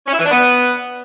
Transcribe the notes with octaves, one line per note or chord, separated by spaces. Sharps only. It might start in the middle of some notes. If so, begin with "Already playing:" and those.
C#4
E4
E3
D4
B3